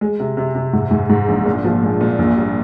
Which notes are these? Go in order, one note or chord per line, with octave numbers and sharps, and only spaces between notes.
G#3
C3
C3
C3
G#2
G#2
G#2
A#1
A#2
F3
G#3
A#2
A#1
G3